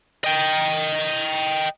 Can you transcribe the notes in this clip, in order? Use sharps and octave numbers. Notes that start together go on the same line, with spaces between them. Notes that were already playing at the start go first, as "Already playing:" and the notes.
D#5 G5